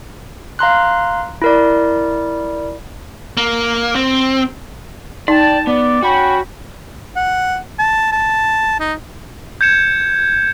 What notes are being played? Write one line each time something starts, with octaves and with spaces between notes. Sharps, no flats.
F5 A#5 C6 F#6
E4 A#4 D5
A#3
C4
D#4 D5 G5 A5
B3 D5
C#4 F#4 G5 B5
F#5
A5
A5
D#4
G6 G#6 C#7 E7